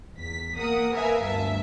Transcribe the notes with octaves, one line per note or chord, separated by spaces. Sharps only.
E2 B6
A#3 A#4 F#5 D#6
A#4 B4 E5 F5 G#5
G1 D2 E5 A5